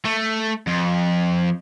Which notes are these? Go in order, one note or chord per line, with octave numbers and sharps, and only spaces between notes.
A3
F2